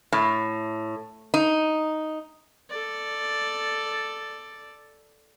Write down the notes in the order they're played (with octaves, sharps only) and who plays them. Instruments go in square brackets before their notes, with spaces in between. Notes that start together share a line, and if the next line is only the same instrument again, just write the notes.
[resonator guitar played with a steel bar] A2
D#4
[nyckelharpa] A4 D5